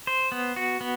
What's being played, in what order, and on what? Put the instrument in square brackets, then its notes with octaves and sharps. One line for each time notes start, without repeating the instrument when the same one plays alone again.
[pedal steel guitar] C5
B3
F#4
B3